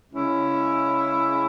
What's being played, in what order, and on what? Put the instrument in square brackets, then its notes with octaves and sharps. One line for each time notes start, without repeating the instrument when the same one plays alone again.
[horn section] C#3 G#3 C#4 E4